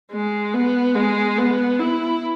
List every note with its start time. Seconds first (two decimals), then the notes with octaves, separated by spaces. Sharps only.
0.12 G#3
0.54 B3
0.95 G#3
1.38 B3
1.79 E4